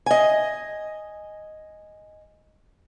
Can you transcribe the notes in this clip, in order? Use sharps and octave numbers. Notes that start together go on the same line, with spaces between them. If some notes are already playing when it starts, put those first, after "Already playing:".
D#5 G#5